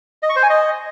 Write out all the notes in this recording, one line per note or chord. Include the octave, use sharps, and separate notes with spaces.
D#5
C#6
C5
G#5
D#5